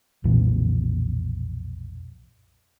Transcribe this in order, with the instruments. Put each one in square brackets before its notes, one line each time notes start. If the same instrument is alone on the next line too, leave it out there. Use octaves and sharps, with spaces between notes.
[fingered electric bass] B1 F2 A#2 E3